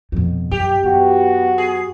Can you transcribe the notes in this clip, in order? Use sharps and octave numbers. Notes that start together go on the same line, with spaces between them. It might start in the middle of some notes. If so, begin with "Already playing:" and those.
F2 B2
F#2 G4
F#2 B3 F#4
G#4